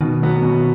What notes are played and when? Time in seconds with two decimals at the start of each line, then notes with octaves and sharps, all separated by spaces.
0.01 B2 D#3
0.22 F#3 B3 F#4
0.43 B2